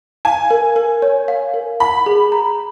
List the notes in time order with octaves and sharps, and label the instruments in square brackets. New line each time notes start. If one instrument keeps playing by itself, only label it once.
[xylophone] F5 [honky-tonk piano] G#5
[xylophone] A#4
A#4
C#5
F5
A#4
[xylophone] F#5 [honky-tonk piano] B5
[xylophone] G#4
A#5